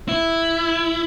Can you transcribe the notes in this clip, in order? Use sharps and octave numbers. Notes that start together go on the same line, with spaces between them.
E4